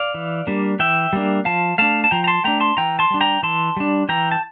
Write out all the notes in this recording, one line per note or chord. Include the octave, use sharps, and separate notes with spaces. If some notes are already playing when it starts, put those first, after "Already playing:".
Already playing: D5 F5
E3
G3 A#3 D4
E3 E5 G5
G3 A#3 D4
F3 F5 A5
A3 D4 F5 A5
A5
F3 G5 A#5
A#5
A5 C6
A3 D4 G5 A#5
A5 C6
E3 G5 A#5
A5 C6
G3 D4
G5 A#5
E3 A5 C6
G3 D4
E3 G5 A#5
A5